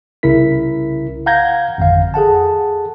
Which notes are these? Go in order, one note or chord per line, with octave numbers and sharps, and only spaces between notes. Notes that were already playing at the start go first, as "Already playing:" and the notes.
C2 C#3 E4 A#4 B6
F5 F#5 A#5 G6 G#6 A#6
G#1 F2 D3 F5
G#4 A4 F#5 A5